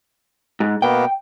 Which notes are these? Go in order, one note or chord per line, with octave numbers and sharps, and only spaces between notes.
G#2
B2 A#3 B3 G5